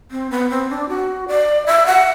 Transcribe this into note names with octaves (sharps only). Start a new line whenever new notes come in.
C4
B3
C4
D4
F#4
D5
E5
F#5